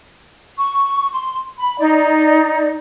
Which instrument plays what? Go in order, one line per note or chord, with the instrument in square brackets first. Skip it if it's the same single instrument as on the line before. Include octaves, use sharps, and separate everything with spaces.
[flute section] C#6
C6
B5
D#4 D5